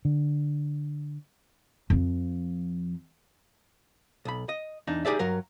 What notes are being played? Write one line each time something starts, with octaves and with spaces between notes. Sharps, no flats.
D3
F2 F3
B1 B5
D#5
E2 D4 D#4
D#4 G4 G#4 D5 E5
G2 F#3 A#4